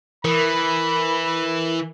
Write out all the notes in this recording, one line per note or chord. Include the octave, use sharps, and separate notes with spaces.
E3 A#4 B5